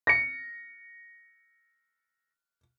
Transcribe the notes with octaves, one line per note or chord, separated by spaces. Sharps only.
A#6 C#7